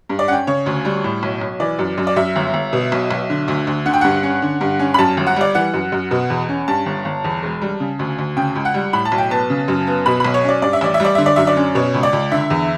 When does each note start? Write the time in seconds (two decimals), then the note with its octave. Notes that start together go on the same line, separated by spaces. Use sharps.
0.10 G2
0.19 D5
0.28 C#4 F#5 G5
0.47 C#3 C#5
0.66 D2
0.85 G3
1.04 A2
1.23 B1
1.41 B1
1.60 E3 D5
1.79 F#2
1.98 F#2
2.07 D5
2.16 F#2 E5
2.36 G1
2.54 G1
2.73 B2
2.92 B1
3.11 B1
3.30 D3
3.48 D2
3.67 D2
3.86 D3 F#5
3.94 G5
4.01 G2 F#5
4.23 C#4
4.42 D3
4.61 G2
4.79 C#4
4.94 B5
4.98 F#2 A5
5.17 G1
5.27 F#5
5.36 G3 D5
5.55 E3 F#5
5.74 F#2
5.92 F#2
6.11 B2
6.30 E2
6.49 C#4
6.68 G2 A5
6.86 G1
7.05 G1
7.24 E2
7.43 E1
7.61 G3
7.80 C#3
7.99 D2
8.18 D2
8.37 C#3 G5
8.55 C#2
8.65 F#5
8.74 G3
8.93 A2 B5
9.05 A5
9.12 B1
9.18 G5
9.31 B3 A5
9.50 C#3
9.68 F#2
9.87 B3
10.06 B2 B5
10.20 B1 B5
10.34 C#5
10.44 C#4 D5
10.62 G2 D5
10.73 E5
10.81 A1 D5
10.94 E5
11.00 G3 D5
11.15 D3 E5
11.26 D5
11.36 F#2 E5
11.47 D5
11.56 C#4
11.75 B2 C#5
11.94 C#2
12.03 D5
12.13 C#2
12.32 D3 E5
12.50 E2